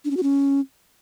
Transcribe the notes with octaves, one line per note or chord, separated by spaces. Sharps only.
D4
C#4
F#4
C#4